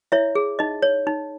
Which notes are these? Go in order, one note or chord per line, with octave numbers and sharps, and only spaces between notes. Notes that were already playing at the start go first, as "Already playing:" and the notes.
E4 C#5 E5
G#4
D#4 D#5
C#5
D#4